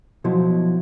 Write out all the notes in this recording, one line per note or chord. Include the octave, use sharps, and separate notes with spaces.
B2 F3 F#3 E4 C6